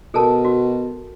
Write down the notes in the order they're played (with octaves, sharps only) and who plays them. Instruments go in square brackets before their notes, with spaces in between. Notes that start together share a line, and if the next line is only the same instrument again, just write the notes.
[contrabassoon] B2 [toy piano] A4 A#4 A5
[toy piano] F#4